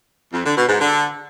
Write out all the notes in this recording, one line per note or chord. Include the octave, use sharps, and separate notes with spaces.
F2
D3
B2
G#2
D3